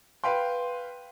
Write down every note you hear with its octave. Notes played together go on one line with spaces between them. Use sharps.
B4 F5 G5 C6